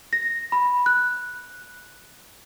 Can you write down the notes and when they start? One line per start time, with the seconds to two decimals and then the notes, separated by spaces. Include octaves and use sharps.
0.13 A#6
0.52 B5
0.86 F#6